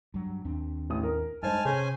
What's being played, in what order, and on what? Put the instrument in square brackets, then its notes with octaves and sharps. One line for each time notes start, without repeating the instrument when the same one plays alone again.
[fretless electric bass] G2 F#3
D#2 C4 D4
[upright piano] A1 D#6
A#4
[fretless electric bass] G2 G#3 [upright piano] D#4 C5 [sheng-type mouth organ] G#5 A5 F6
[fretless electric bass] C3 [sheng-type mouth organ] C#4 C5 G#5 [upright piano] G#4